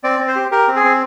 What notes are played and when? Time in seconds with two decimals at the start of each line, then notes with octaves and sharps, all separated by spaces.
0.04 C4 D5
0.19 C4
0.28 C5
0.36 G4
0.52 G4 A#4
0.68 C4
0.76 G#4
0.84 C4